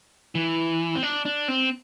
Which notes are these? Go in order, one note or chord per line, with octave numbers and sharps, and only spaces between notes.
E3
C4
D4
D4
C4